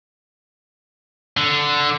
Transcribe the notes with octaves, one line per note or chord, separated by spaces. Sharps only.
D3